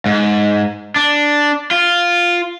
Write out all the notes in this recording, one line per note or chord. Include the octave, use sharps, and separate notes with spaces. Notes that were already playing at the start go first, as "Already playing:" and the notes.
G#2
D4
F4